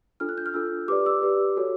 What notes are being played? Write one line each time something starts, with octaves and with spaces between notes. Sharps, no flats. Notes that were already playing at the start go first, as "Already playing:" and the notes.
D4 F4 A4 F6
F#6
G6
F6
D4 F4 A4 E6
G4 B4 D5 D6
E6
G4 B4 D5
F#4 A4 C#5